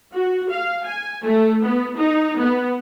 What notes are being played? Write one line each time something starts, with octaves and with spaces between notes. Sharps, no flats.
F#4
F5
G#5
A3
B3
D#4
B3